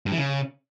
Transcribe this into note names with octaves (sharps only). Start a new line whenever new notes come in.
G2
E3
C#3